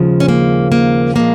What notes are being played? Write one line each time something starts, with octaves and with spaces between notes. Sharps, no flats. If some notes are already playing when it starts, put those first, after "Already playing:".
Already playing: D#2 C#3 F3 G#3
C#4
A#3
A#3
A#2 F3 G#3 A#3